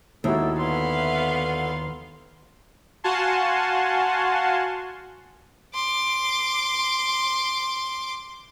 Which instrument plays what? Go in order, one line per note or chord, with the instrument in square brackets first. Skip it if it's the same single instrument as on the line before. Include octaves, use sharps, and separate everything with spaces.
[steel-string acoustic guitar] D#2 [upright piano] D#4 E4 F#4 [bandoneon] A4
[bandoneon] D3 C6 [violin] B3 F5
[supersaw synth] F#4 F5 F#5 G#5 A5 C6
[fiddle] C6 D6